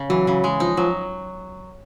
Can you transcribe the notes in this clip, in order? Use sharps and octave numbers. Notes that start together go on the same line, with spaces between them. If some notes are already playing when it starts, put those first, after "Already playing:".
Already playing: C#3
E3 F#3
C#3
G#3
F3 D#4
F3 F#3